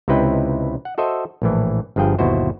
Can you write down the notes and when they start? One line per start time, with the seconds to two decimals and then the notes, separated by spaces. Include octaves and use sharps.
0.08 C#2 C3 D#4 E4 B4 G5
0.85 F#5
0.98 F#4 A4 C5 D#5 E5
1.42 A#1 A2 E3
1.96 G1 G2 F3 G#4 G5
2.19 G1 D#2 B2 E4 F#4 C5